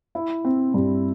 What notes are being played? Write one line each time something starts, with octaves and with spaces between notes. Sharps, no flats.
E4
C4
G2